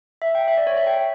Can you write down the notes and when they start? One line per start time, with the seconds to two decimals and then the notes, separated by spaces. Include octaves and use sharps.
0.22 E5
0.35 G5
0.48 E5
0.57 D5
0.67 C#5
0.77 E5
0.87 G5